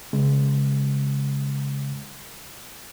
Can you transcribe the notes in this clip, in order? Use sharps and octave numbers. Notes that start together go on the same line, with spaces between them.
C#3 G#3